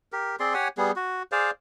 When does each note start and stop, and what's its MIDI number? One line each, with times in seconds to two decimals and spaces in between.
0.12 0.36 67
0.12 0.36 70
0.40 0.53 60
0.40 0.53 68
0.40 0.53 74
0.40 0.53 84
0.54 0.68 67
0.54 0.68 73
0.54 0.68 78
0.54 0.68 80
0.77 0.91 55
0.77 0.91 59
0.77 0.91 68
0.96 1.23 66
1.32 1.51 68
1.32 1.51 72
1.32 1.51 74
1.32 1.51 77